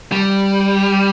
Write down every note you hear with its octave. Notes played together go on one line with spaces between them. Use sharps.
G3